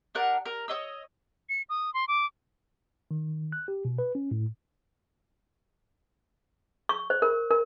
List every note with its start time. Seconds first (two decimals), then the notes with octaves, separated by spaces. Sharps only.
0.15 D4 A#4 F#5
0.46 A#4
0.68 C#5 D#5 E6
1.49 C#7
1.69 D#6
1.94 C6
2.08 D6
3.11 D#3
3.52 F#6
3.68 G4
3.85 B2
3.98 B4
4.15 C#4
4.31 A2
6.89 C#6
7.10 C5
7.22 A#4
7.51 A#4